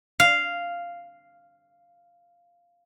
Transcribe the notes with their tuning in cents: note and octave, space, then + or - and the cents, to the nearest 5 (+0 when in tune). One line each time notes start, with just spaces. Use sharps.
F5 -5